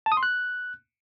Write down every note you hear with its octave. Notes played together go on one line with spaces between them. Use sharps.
A5
D#6
C6
F#6